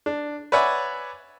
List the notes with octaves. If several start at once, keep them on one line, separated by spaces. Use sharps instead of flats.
D4
B4 C#5 D5 E5 F#5 G#5